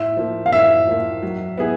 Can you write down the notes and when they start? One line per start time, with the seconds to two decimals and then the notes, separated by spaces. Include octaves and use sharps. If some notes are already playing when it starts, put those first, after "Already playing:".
Already playing: A2 E5
0.17 F3 A#3
0.46 F5
0.52 A2 E5
0.87 F3 A#3
1.22 F#3
1.57 B3 E4 G#4